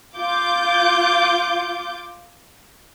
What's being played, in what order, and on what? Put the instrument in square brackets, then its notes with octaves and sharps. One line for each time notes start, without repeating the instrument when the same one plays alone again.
[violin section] F4 D6 G6